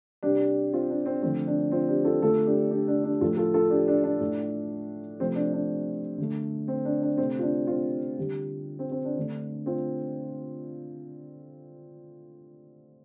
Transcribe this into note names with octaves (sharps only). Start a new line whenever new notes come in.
C3 G3 D4 G4
C4 F4
D4
C4
D3 F3 A3 C4
D4
C4 F4
D4 G4
F4 A4
D3 A3 F4 A4
D4 G4
D4 G4
D4
D4 G4
A2 F3 A3 F4 A4
F4 A4
F4 A4
D4 G4
D4
D4
A2 A3
C3 F3 A3 C4
D4
D4
D3 A3
C4
D4
D4
C3 A3 C4
F4
D4
C4 F4
D3 G3
C4
C4
D4
D3 A3
C4 F4